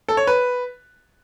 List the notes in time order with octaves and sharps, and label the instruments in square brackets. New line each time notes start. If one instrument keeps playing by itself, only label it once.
[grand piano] A4
C#5
B4